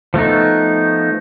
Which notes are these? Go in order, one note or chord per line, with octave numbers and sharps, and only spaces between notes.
F3 A3 B3 D#4